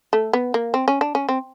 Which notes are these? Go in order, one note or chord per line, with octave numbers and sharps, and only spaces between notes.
A3
B3
A#3
C4
C#4
D4
C#4
C4